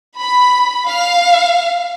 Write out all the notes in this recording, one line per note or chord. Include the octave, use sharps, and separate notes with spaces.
B5
F5